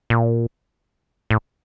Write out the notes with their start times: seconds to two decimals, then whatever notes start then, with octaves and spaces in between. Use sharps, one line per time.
0.10 A#2
1.30 A2